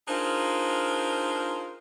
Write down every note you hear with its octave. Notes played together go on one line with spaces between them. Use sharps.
D4 D#4 F4 G#4 A#4 C5